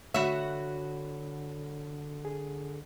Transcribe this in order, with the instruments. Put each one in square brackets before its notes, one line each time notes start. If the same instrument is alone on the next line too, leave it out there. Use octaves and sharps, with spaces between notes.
[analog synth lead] D3 [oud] F#4 E5 [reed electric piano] C#5 B5
[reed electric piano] G#4